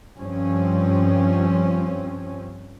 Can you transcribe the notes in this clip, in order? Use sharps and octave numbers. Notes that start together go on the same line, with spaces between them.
G2 F3 C4 C#4